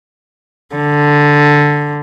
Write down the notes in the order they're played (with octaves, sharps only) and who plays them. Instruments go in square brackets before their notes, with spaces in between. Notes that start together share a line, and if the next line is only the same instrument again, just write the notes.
[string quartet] D3